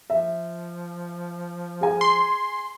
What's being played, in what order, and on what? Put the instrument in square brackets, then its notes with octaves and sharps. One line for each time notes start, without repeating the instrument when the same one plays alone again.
[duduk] F3 [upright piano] E5
[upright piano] G#4 G#5
[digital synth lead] C6